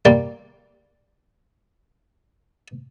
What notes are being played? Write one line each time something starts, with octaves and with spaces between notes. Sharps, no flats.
G3 A#3 D5 G5 C6